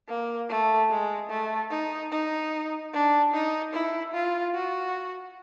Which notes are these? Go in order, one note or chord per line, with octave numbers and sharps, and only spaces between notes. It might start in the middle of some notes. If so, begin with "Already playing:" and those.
A#3
A3
G#3
A3
D#4
D#4
D4
D#4
E4
F4
F#4